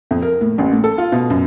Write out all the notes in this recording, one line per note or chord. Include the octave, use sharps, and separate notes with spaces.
F2
A#4
A2
A1
A2
A4
F4
B2
F#2